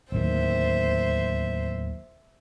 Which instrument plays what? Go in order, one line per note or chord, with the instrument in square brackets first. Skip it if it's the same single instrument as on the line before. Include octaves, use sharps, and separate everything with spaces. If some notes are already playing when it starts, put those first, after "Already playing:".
[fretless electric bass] D1 D#2 [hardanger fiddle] C5 E5